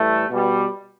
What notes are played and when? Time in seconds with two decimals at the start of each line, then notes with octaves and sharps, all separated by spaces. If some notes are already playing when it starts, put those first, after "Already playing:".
Already playing: A2 E3 G3 A3
0.30 B2 G3